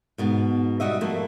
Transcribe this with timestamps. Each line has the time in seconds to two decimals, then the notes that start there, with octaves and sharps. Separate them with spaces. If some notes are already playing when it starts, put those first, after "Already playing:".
0.18 G#2 B2 B3
0.80 G3 F#4 D#5 E5
1.01 F3 A3 A#3